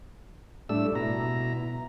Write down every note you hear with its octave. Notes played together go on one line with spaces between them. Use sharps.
A2 G3 A3 D4 E6
B2 E4 A#5